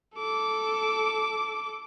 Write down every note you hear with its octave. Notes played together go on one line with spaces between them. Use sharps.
A4 D6